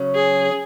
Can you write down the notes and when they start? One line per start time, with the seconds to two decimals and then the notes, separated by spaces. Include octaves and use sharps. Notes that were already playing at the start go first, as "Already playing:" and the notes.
Already playing: C#3 F#3 C#4
0.15 G#4